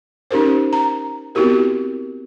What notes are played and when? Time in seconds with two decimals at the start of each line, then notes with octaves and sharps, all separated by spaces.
0.31 C#4 D#4 G4 A#4 C5
0.73 A#5
1.35 B3 C4 E4 F#4 G4 A#4